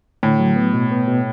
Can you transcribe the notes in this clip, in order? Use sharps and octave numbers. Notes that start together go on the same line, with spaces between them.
A2 D3
F#3
B3
B2
B3
B2